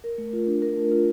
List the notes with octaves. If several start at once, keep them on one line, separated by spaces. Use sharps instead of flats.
A#4
A3
F4
D4
A#4
A3
F4